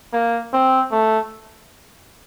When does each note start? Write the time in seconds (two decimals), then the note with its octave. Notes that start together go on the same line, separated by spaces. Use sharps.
0.13 A#3
0.53 C4
0.91 A3